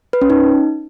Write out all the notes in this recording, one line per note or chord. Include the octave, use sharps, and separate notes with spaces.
B4
C#4
D#4